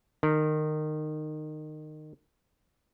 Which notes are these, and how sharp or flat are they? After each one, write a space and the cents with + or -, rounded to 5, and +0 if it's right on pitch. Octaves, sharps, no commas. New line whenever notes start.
D#3 -20